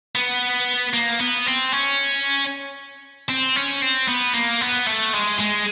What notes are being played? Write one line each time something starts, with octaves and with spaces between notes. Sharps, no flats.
B3
A#3
B3
C4
C#4
C4
C#4
C4
B3
A#3
B3
A3
G#3
G#3